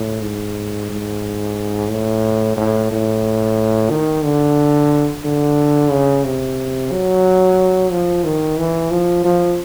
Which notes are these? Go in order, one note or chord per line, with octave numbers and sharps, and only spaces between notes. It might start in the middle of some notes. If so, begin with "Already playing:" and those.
Already playing: A2
G#2
G#2
A2
A2
A2
D#3
D3
D3
C#3
C3
F#3
F3
D#3
E3
F3
F3